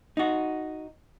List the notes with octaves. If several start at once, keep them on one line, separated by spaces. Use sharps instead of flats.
D#4 F#4